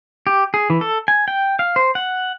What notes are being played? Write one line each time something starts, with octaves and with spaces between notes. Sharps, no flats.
G4
G#4
E3
A4
G#5
G5
F5
C5
F#5